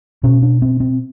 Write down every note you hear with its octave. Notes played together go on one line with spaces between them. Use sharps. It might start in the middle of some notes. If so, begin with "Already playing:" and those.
B2 C#4
D4
C4
C4